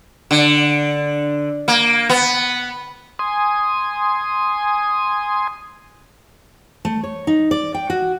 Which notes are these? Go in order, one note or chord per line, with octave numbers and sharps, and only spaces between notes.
D3
A#3
B3
G#5 C6 D#6
A3
C#5
D#4
D5
G5
F#4